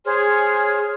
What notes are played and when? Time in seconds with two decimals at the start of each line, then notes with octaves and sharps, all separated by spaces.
0.05 G#4 C5 C#5 F6